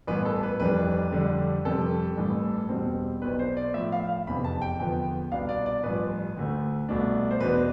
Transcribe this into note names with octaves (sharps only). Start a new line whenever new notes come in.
A1 G2 E3 B3 E4 B4
A4
B4
F1 F2 E3 G3 D4 B4
F2 D3 G3 D4
F2 C3 G3 A4
A1 G2 E3 A3
E2 B2 G3 C4
B1 B2 B3 D4 B4
C5
D5
A2 F3 A3 E5
F5
F5
F1 E2 C3 E3 B5
A5
G5
E2 D3 F3 B3 G5
C2 B2 B3 D4 F5
D5
D5
A1 G2 F3 B4
D2 D3 A3
C2 B2 A3 D4
C5
E2 B2 B3 D4 B4